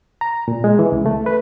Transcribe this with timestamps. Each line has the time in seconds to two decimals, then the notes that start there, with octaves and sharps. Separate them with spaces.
0.21 A#5
0.48 A#2
0.64 G#3
0.79 E3
0.92 C#2
1.06 A3
1.26 B4